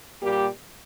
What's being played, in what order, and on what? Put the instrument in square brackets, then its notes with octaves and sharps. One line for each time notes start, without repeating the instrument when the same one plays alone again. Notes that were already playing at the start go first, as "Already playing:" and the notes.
[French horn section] A#2 G3 A#3 G4